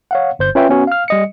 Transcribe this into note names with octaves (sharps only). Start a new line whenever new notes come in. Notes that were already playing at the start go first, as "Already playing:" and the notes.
C#5 F5 F#5
G1 C5 G6
C#4 F4 B4 C#5 E5 G5
B3 C#4 F#4
F5 F6
G3 D#5 C#7